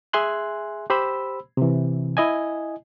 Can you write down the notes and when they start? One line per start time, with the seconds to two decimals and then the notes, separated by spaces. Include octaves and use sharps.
0.13 G#4 E5 G#5 C6 F#6
0.90 G4 C5 B5 E6
1.57 C3 E3
2.17 E4 D#5 G#5